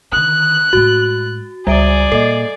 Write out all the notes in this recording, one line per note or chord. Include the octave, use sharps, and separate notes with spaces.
D3 D#3 D#6 F#6
A2 G#3 F#4
C#2 G3 G#4 D5 E5 D7
A#2 A4 D#5